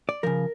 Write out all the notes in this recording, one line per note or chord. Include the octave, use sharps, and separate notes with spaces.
D5
C#3 F3 A#4